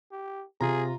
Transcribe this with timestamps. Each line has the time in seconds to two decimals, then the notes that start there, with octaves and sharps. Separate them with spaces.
0.11 G4
0.61 C3 F4 G#4 A#5